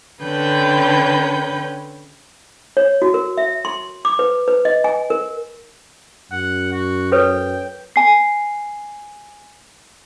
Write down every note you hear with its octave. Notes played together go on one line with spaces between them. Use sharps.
D3 C#4 B4 G5 G6
C#5
F#4
A#4
E5
C6
D6
B4
B4
D#5
G#5
A#4
F#2 F#5
F#4
A4 B4 C#5 G5
G#5 C7